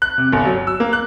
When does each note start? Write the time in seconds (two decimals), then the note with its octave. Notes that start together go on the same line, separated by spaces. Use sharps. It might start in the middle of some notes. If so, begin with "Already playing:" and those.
0.02 F#6
0.18 C3
0.33 G1
0.45 F#3
0.67 E6
0.80 A#3
0.93 F#6